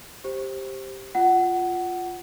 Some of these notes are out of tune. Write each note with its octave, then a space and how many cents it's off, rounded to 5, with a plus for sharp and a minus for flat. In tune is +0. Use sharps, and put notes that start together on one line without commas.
G4 +0 C5 +15
F4 +0 F#5 +15